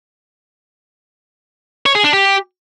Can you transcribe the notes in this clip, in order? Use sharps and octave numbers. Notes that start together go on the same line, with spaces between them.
C#5
G#4
D4
G4